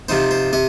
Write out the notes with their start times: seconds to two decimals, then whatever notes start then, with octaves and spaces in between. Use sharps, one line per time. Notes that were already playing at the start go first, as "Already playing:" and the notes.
0.09 C3 F3 D#4 C5
0.31 C5
0.53 C3 D#5